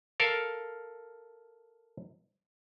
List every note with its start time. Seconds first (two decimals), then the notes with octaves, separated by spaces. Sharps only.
0.20 A4 A#4 F5